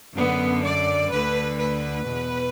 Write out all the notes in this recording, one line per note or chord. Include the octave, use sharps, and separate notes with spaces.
F#2 D3 B3
D5
D2 D3 B4
B4
E2 B2